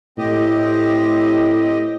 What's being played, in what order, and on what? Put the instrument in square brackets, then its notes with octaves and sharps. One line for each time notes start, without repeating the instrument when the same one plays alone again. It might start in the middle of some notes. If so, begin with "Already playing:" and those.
[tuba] A2 [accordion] C4 G4 D#5